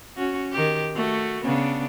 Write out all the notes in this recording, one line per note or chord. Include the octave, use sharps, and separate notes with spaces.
C#4 F#4
D#3 G4
A3 F#4
C#3 B3 D4